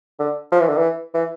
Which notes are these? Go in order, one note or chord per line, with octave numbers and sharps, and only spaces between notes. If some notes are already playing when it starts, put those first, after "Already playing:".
D3
F3
E3
D3
E3
E3